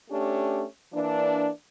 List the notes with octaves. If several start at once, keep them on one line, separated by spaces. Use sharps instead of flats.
A3 C#4 D4 G4
E3 A#3 D4